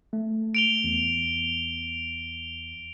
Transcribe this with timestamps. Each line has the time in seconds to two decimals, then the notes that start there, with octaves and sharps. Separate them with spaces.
0.13 A3
0.55 D7 F7 G7
0.84 E2